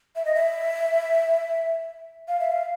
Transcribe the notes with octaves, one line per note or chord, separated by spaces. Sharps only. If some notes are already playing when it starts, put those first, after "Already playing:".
E5
D#5
E5
F5
E5
F5